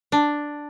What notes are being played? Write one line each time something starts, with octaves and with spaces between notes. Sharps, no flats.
D4